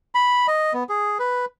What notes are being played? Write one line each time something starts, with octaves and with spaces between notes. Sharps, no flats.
B5
D#5
B3
G#4
B4